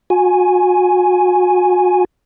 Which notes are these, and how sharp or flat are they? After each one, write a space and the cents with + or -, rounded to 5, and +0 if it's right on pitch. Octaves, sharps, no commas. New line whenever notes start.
F#4 -35 G#5 +0